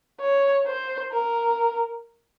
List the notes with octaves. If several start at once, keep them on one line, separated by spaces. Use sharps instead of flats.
C#5
C5
A#4